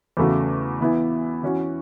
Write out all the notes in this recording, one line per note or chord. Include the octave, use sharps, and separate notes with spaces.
E2 C#3 A3 F#4
E3 B3 E4
E3 C#4 F#4